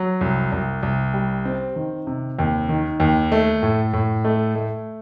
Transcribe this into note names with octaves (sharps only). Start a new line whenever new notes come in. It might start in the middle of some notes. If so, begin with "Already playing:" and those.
Already playing: F#3
C2
C2
C2
G3
C4
D#3
C3
D#2
D#3
D#2
A3
A2
A2
A3
A3